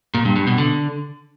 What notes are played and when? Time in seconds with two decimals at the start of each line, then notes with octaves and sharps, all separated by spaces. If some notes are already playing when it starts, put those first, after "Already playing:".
0.14 A#2
0.25 G2
0.36 G2
0.47 B2
0.58 D3